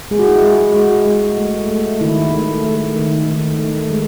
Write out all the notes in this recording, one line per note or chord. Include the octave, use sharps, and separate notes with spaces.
G#3 G#4
F#4
E4
F#4
G#3
G#3 F#4
G#3
A3
A3
D#3 E4
A3
A3
D#3
D#3
A3
G#3